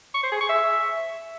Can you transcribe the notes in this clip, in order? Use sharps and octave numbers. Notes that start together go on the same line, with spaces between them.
C#6
C5
G#4
C#6
E5